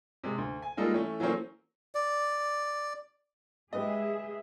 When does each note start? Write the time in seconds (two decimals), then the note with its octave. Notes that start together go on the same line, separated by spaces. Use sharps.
0.24 C3 G#3
0.38 D2
0.62 G#5
0.77 G3 G#3 A#3 D#4 F4 A4
0.94 E3 A3 C#4
1.20 E3 F#3 A3 A#3 C#4 C5
1.95 D5
3.73 G#3 G4 G#4 B4 D#5 E5